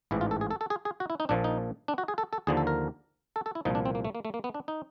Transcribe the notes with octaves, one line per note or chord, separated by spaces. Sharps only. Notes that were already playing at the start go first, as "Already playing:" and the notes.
A1 G#2 E3 E4
F4
A4
G#4
A4
A4
G#4
G#4
F#4
E4
D#4
A#1 A#2 F3 D4
D#4
D4
F#4
G#4
A4
A4
D#2 D3 F3 G#4
A4
A#4
A4
A4
E4
C2 A#2 F3 D#4
D4
C4
A#3
A3
A#3
A3
A#3
B3
D4
D#4